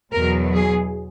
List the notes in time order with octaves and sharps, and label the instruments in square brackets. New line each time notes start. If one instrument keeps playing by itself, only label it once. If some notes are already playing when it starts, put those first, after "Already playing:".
[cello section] E2 B2 F#3 A#4
G#4